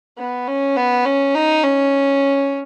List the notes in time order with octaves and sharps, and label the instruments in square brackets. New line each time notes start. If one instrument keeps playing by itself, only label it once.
[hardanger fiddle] B3
C#4
B3
C#4
D#4
C#4